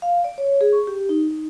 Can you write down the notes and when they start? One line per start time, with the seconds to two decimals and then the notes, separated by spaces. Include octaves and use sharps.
0.02 F5
0.24 D5
0.38 C#5
0.61 G#4
0.72 C#6
0.87 G4
1.09 D#4
1.31 D#4